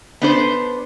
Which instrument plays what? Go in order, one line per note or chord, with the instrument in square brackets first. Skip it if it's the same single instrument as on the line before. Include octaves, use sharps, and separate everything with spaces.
[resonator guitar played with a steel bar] B3 D4 C5